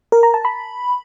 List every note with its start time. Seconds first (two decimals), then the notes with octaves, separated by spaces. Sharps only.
0.12 A#4
0.23 A#5
0.34 A5
0.45 B5